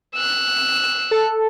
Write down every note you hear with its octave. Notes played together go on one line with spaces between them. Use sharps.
E6 F#6
A4